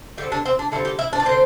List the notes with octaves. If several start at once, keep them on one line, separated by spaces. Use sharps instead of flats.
D3 G3 C4 G4
D4
C4
D4
D3 G3 C4 E4
G4
E4
D4
D5
D3 C4 C5